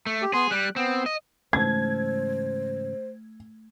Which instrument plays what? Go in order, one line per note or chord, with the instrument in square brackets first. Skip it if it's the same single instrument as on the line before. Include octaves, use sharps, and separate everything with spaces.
[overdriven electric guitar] A3
[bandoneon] G4
[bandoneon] B3 C6 [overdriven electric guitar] G#4
[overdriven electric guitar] G3 [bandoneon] F#6
[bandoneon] B3 [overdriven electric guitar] C4
[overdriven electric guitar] D#5
[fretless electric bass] G#2 C#3 E3 [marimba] A3 [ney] C5 [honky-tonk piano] G#6